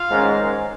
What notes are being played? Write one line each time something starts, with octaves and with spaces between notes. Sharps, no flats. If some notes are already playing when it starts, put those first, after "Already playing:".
Already playing: F4 F5
G#2 D#3 C#4